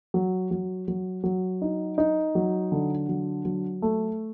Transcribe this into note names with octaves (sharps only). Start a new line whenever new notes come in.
F#3
F#3
F#3
F#3
D#4
D#4
F#3
D3
F#3
F#3
A3